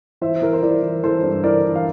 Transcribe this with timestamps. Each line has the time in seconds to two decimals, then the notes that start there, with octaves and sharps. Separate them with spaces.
0.21 E3 C5 E5
0.42 E3 A#4
0.53 C5
0.62 E3 A#4 D5
0.82 E3
1.04 E3 A4 C5
1.23 G2
1.44 E3 A#4 D5
1.65 E3
1.75 F5